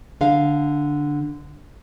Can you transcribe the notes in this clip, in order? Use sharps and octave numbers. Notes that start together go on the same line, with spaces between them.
D3 F5